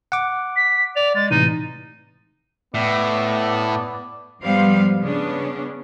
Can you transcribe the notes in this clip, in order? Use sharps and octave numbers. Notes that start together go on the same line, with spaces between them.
F#5 D6
B6
D5 F7
G#3 A6
A2 C3 E3 D#4 D#7
A2 B3 D5
G#2 F3 G3 B3 C5 F5
C#3 B3 C#4 D4